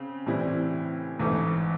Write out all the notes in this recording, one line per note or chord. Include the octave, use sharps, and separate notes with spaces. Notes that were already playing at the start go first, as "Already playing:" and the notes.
Already playing: C#3 C4
A2 E3 G3 C4 E4
A1 G#2 E3 A3